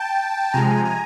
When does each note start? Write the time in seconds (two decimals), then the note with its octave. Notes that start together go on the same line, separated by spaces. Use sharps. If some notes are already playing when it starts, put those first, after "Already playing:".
Already playing: G5 A5
0.54 C3 F3 G#3 G#5 A#5
0.85 G#5 A#5